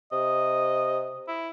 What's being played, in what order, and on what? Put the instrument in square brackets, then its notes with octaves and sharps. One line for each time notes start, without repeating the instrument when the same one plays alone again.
[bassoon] C3 [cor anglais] D#5
[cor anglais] E4